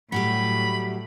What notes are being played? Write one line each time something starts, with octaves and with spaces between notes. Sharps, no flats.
A2 F#3 G3 G4 B5